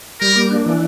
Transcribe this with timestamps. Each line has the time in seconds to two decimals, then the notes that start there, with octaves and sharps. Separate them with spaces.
0.21 G3 A#4
0.36 A#3
0.51 D4
0.66 E3